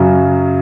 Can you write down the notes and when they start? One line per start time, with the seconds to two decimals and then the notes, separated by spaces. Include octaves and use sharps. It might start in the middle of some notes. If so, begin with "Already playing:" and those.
Already playing: F#2 C#3 F#3